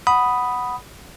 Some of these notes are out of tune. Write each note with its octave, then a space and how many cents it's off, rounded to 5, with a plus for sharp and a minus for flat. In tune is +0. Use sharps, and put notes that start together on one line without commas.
F#5 +0 B5 +0 D#6 +0